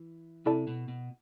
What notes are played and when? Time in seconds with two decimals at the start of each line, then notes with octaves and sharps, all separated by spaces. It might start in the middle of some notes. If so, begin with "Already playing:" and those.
Already playing: E3
0.45 C3 E4 A4 D5 A5
0.67 B2
0.88 B2